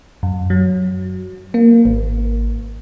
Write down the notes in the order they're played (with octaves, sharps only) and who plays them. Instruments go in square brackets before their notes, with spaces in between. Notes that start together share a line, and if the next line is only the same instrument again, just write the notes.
[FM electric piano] F#2
F#3
A#3
G#1